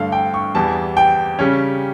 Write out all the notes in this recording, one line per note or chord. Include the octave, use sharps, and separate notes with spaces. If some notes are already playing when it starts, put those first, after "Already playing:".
Already playing: G2 D3 A3 F5
G5
C#6
E2 E3 G3 A5
G5
C#3 G3 C#4